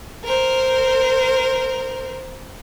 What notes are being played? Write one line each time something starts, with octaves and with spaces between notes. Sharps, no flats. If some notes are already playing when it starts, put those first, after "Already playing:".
A#4 C5